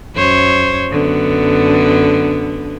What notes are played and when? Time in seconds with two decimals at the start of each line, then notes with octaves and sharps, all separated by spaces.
0.15 F#2 C5 C#5
0.91 F#2 D3 B3